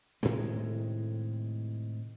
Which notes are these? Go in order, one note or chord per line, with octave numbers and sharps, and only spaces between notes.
A2 C3 D#3 G#3